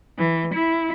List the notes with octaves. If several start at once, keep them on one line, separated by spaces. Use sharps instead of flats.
E3
E4